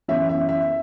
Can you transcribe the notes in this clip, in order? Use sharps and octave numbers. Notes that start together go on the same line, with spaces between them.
F#2 E3 B3 E5
E5
E5